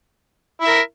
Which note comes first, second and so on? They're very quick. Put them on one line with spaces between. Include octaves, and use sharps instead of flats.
E4 E5 A#4